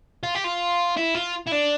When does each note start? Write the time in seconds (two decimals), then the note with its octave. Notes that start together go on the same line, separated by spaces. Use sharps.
0.23 F4
0.35 G4
0.44 F4
0.97 E4
1.15 F4
1.47 E4
1.52 D4